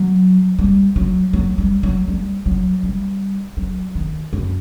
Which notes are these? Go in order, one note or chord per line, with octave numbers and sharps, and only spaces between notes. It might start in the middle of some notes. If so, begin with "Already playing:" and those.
Already playing: F#3
G3
F#3
F#3
G3
F#3
G3
F#3
G3
F#3
D#3
F#2